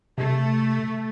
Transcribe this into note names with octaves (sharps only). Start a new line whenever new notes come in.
C3 A3